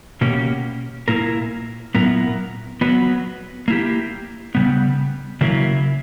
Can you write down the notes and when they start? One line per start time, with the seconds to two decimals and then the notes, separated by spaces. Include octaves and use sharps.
0.21 B2 A#3 C#4 G4
1.08 A#2 A#3 E4 A#4
1.95 A#2 F#3 B3 E4 A#4
2.81 F#3 B3 F#4 B4
3.68 A#3 E4 G4
4.55 C#3 G3 B3
5.41 C#3 F#3 A#3 E4 A#4